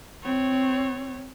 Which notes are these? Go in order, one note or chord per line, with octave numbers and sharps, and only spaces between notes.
C4 C#5